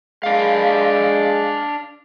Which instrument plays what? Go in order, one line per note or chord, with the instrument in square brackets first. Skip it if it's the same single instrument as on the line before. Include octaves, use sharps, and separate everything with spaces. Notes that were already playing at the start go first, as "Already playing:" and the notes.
[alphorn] G#3 [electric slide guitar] D4 F5